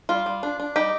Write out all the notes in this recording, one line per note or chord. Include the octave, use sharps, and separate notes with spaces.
G3 F4
G3
D4
D4
G3 D#4 G4